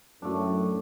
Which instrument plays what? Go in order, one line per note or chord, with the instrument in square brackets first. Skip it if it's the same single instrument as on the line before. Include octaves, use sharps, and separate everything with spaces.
[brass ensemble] F#2 A2 [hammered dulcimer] A3 D4